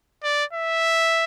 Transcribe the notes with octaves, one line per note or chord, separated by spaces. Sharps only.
D5
E5